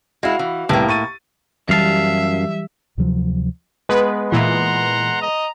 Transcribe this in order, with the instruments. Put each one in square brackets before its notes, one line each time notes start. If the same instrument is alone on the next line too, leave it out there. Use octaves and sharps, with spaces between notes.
[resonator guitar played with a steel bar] G#3 E4 [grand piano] F#4 F5
[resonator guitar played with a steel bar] E3
[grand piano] C2 B3 G5 [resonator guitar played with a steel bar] A2 A#3
[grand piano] C#6 A6 D#7
[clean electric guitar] F#2 F5 A5 [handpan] E3 F#3 G3 [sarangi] E5
[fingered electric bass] D2 C3 F3 F#3
[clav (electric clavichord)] G#3 B3 [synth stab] B4
[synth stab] A#2 E3 [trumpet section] F#5 A#5 C6
[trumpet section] D#5 A#5